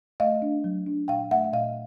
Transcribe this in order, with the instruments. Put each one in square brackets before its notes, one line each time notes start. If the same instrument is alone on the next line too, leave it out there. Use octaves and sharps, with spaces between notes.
[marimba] A3 D#5 F5
D4
F#3
D4
A#2 F5 G5
A3 E5 F#5
F#5
A#2 D#5 F5